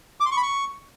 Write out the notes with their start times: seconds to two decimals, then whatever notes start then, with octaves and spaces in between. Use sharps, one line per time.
0.20 D6
0.26 C6
0.31 C#6
0.37 B5
0.43 C#6